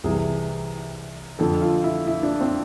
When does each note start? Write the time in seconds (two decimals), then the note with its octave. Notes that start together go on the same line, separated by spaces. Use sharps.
0.04 C2 C3 E3 G#4
1.39 F2 D3 A4
1.61 F4
1.84 E4
2.07 E4
2.23 D4
2.41 C4